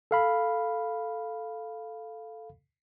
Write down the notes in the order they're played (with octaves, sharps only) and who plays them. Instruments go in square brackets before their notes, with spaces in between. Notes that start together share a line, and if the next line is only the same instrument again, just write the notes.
[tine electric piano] A4 F5 B5